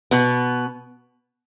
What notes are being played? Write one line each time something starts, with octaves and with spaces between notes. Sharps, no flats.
B2 B3